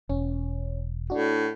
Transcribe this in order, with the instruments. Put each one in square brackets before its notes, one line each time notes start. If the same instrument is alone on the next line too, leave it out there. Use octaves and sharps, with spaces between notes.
[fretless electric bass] E1 [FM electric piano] C#4
[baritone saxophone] A2 [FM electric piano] D4 F#4